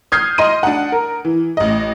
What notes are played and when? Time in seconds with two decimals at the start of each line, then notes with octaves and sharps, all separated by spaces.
0.12 D#6 F6 G6 G#6 C7
0.38 D#5 C6 D#7
0.63 D4 F#5
0.92 A#4
1.25 E3
1.57 A1 D#5